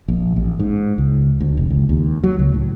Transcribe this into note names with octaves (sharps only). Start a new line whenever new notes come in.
A#1
A1
G#2
C#2
D2
F1
C#2
D#2
F#3
C#2
A2